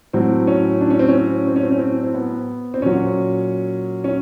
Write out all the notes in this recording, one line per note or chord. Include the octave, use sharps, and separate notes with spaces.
A2 F#3 C4
C#4
D4
C#4
C4
C#4
C4
C#4
C4
C#4
C4
C4
B3
C4
A#2 F#3 C#4
C#4